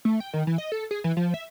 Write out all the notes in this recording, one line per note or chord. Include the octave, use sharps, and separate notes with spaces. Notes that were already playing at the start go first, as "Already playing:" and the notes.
A3
G5
D#3
E3
D#5
A4
G#4
E3
F3
E5